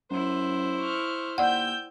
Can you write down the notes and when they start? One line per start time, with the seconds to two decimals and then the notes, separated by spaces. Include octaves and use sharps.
0.11 F#2 E4 C5
0.80 C#6 F6
1.38 D#2 D5 F#5 G5 E6 G6